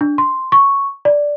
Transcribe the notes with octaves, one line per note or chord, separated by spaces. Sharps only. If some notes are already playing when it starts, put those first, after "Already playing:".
D4
C6
C#6
D5